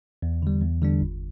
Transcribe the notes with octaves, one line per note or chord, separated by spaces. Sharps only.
E2
D3 G3
E2
D3 G3 D4
G1